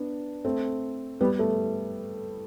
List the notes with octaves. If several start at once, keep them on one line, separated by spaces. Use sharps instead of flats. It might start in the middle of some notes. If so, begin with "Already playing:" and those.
Already playing: B3 D4
A3 C4
G3 B3
A3